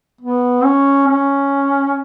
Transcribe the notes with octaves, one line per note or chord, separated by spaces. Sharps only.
B3
C#4
C#4